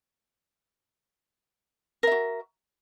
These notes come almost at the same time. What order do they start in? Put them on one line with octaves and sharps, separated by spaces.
A#4 E5 F#4